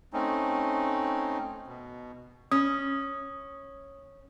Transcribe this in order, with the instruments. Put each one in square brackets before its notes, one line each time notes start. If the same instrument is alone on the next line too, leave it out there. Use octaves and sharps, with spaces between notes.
[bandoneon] A3 C4 C#4 D#4
B2
[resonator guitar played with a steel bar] C#4 [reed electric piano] D#6